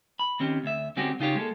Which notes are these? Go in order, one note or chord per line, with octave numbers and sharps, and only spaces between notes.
B5
D#3 C4 C#4 G4
D2 E5
D3 G#3 C4 C#4 F#4 G4
C#3 D#4 F4 G4 C#5
G#3 A#3 A4